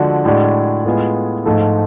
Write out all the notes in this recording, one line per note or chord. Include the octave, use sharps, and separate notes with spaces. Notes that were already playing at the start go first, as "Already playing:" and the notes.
Already playing: D3 F3 G#3 D4 F#4
A2 G#3 D4 F#4
A2 G#3 B3 F4 G#4
G#2 F3 A3 F4 A4